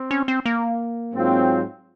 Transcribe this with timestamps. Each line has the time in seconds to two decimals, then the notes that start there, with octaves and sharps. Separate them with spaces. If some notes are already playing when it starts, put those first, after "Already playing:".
Already playing: C4
0.11 C#4
0.28 C4
0.46 A#3
1.14 G#2 F#3 C4 F4